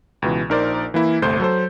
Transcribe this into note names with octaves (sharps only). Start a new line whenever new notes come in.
C#2 B2 E3
A#1 D#4 A#4 C5 D5
E3 A#3 E4
G1 C2 A3 C5 C6 G6
F#3 A4 C5